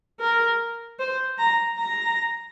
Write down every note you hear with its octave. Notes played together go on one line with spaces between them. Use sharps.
A#4
C5
A#5
A#5